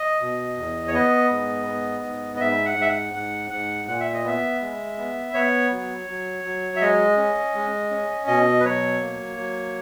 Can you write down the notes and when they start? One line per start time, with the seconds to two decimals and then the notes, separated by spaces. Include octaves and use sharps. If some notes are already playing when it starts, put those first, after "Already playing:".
Already playing: D#5
0.21 B2
0.57 E2
0.88 C#5
0.94 B3 D#5
1.30 G#2
1.67 B3
2.04 G#2
2.36 D#5
2.41 G#2 E5
2.65 F#5
2.77 G#2 E5
2.89 F#5
3.14 G#2 F#5
3.50 G#2 F#5
3.88 A#2 F#5
4.00 E5
4.14 D#5
4.24 B3 E5
4.61 G#3
4.98 B3
5.34 B3 C#5
5.71 F#3
6.07 F#3
6.44 F#3
6.76 E5
6.81 G#3 D#5
7.17 C#4
7.55 G#3
7.91 C#4
8.27 B2 D#5
8.60 B4
8.65 F#3 C#5
9.01 A#3
9.38 F#3